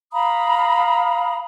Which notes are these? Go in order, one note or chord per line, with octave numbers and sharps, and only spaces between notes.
F5 A#5 B5 D#6